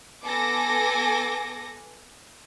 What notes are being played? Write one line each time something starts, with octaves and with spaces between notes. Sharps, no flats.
B3 A4 G#5 D6 A#6